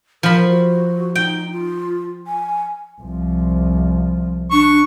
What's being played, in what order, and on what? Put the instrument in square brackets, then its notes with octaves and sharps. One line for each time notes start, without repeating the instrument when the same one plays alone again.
[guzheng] F3 B5 [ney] A#4
[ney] F#4
[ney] D#4 [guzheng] G5
[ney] F4
G#5
[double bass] C2 F3
[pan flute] D4 [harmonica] C#6